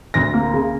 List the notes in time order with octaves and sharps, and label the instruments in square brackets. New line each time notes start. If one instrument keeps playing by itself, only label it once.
[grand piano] D2 A#6
A#3
C#3